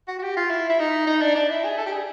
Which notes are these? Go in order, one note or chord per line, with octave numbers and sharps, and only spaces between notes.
F#4
F#4
G4
F4
E4
E4
D#4
D#4
D4
D4
E4
G#4
A4
G4
G#4